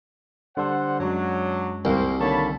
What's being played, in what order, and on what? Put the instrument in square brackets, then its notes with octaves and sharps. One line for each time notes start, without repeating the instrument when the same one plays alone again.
[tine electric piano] D3 G3 A4 [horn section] C5 F#5
[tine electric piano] F#2 G#3 [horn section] F#3 D4
[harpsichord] C2 [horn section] A#3 F#4 C5
[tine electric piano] D3 D#3 A#3 [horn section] C#5 A5 B5